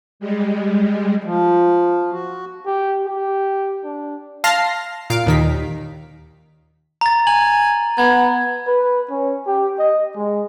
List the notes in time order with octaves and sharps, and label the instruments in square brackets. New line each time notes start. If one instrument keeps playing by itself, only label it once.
[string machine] G3 G#3
[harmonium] F3
F#4
[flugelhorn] G4
G4
D4
[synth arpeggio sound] F5 A5 C6 F6 A#6 C7
A#2 F5 D7
D#2 D#3 B6
[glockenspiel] A#5 A6
[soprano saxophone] G#5 [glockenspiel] F#7
[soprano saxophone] B3 [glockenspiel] G#6
[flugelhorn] B4
C#4
G4
D#5
G#3